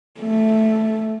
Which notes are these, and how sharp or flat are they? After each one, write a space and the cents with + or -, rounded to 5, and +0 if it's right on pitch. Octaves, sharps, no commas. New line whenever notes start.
A3 +0